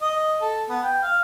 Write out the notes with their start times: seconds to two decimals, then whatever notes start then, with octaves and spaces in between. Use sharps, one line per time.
0.02 D#5
0.41 A4
0.69 B3
0.83 G5
1.02 F5